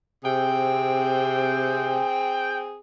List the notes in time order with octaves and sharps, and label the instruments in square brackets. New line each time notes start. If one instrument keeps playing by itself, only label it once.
[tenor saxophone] C3 [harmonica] C4 G#4 [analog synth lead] G5